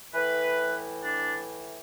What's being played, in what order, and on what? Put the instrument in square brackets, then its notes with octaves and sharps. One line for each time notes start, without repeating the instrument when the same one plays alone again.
[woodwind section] A2 E3 B4
D4